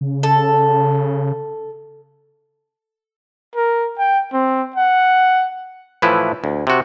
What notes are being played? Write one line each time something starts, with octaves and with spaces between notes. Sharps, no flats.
C#3
A4
A#4
G5
C4
F#5
A2 E3 F3 E4 B4
D2
C3 F#4